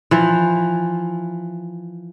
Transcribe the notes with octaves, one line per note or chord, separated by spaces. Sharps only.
E3 F3